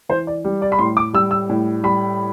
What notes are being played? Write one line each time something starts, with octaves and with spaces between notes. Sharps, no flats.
E3 C5
D5
G3
D5
B5
A2 C6
D6
G3 E6
E6
A2
G3 B5